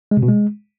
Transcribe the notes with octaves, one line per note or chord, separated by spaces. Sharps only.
G#3
C3
B2
G#3